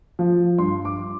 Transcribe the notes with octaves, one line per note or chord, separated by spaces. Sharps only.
F3
G2 C6
D6